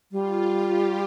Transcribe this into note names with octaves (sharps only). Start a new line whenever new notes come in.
G3 F4
G4